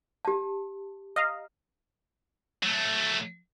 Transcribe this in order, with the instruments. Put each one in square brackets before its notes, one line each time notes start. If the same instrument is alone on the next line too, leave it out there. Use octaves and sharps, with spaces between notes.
[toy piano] G4 A5
[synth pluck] D#5 F5 A#5
[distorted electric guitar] F#3 A3